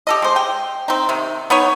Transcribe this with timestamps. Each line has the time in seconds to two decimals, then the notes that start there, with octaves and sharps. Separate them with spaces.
0.07 G4 A4 D#5
0.22 G#3 C5
0.36 G5
0.88 C4 D#4
1.09 C3 D#3
1.50 B3 D#4 C#5